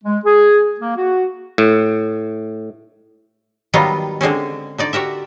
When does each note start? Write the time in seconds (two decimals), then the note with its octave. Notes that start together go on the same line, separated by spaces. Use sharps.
0.04 G#3
0.26 G#4
0.80 A#3
0.97 F#4
1.58 A2
3.74 D#3 F#3 G3 B3 D#4 F4
4.21 D3 G#3 C4 C#4
4.78 D3 D#4 D5
4.93 F#4 G4 A#4 E5